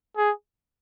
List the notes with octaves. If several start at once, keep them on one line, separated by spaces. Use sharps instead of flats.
G#4